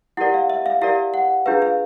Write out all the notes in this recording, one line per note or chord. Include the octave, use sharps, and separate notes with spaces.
E4 G4 A#4 D5 F#5
F5
E5
F5
E4 G4 A#4 D5 F5
F#5
D4 F4 G#4 B4 F5
F5